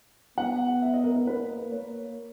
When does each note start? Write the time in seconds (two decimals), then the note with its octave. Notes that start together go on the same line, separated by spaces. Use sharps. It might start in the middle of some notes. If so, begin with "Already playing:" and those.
0.37 B3 F#5
0.82 E5
0.94 D#5
1.04 A#4
1.16 A#4
1.26 A#3 B4
1.71 A#3 C#5